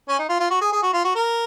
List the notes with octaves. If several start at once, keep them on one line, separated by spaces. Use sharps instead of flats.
C#4
D#4
F4
F4
F#4
G#4
G#4
F#4
F4
F#4
A#4